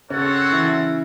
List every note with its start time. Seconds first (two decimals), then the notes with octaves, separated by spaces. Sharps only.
0.10 C#3 C4 C#4 F#4 A4 C#5 F#5
0.52 E3 E4